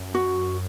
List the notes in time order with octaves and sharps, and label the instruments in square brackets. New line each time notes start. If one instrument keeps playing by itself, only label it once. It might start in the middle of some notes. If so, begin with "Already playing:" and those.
Already playing: [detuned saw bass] F#2
[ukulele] F#4